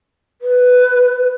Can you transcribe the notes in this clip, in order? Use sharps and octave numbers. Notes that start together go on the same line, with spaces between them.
B4